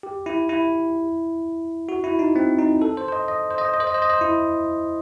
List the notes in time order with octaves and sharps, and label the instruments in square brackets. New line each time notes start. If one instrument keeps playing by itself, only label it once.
[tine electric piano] G4
E4
E4
F#4
E4
D#4
C4
D#4
A4
C5
C5
D#5
D#5
C5
D#5
C5
D#5
C5
D#5
C5
D#5
C5
E4